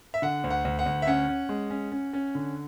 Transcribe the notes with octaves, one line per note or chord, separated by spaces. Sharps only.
E5
D3 F#5
D2
F#5
D2
F#5
D2
E5
C#4 F#5
C#4
G#3
C#4
C#4
C#4
D3